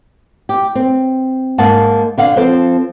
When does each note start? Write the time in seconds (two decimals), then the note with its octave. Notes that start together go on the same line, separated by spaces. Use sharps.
0.49 G4
0.75 C4
1.58 G#2 A#3 F#5 A5
2.18 D3 F5 F#5
2.36 F3 C4 A4 C5